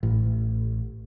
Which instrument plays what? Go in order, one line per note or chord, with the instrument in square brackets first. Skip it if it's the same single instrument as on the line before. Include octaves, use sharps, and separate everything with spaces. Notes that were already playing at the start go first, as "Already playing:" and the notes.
[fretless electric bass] A1